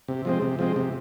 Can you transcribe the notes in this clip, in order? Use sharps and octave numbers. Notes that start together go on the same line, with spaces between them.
C3
F3 G#3 C4
C3
F3 G#3 C4
C3